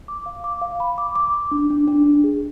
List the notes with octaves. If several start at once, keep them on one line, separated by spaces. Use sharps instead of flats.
D6
F5
D6
F5
B5
D6
D6
D6
D4
D4
D4
D4
G#4